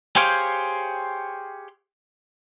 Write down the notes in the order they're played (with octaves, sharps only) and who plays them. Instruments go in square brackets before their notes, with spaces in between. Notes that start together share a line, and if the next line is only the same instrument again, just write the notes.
[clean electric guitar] G4 G#4 C5 C#5 F5 G5